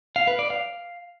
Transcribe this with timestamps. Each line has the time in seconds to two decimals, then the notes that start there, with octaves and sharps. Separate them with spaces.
0.16 F5
0.27 B4
0.39 D5
0.50 F5